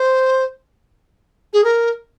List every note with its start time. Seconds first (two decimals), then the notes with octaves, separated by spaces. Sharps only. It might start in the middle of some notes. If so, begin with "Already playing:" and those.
Already playing: C5
1.53 G#4
1.64 A#4